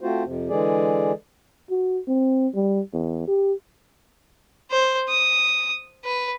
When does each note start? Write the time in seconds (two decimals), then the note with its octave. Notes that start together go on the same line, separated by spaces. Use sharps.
0.01 A3 C4 F4 F#4 C5
0.25 F2 C3
0.49 D3 E3 G#3 G#4 D5
1.71 F#4
2.08 C4
2.55 G3
2.93 E2
3.28 G4
4.71 C5
5.10 D#6
6.05 B4